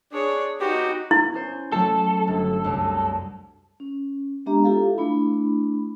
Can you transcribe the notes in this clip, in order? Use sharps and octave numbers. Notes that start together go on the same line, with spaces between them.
D4 G#4 C#5
B3 D#4 F#4 G4
B3 E4
C#4 C5
F#3 A3 A4
G1
C2 F#2
C#4
G#3 B3 D4 G4 E5 A#5
E4 F4 G4 A4 E5 F5
A3 D4 E4 B5